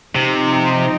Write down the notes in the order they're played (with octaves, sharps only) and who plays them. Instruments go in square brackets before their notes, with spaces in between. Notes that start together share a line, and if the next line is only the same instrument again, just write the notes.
[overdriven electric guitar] C3 [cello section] F3 C4 D#4